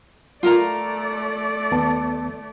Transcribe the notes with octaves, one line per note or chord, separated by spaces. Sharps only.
A3 F4 A#4 D5 A#5
D#2 B3 A5